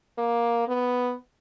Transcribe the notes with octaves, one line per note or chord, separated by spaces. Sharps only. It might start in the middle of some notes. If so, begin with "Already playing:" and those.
A#3
B3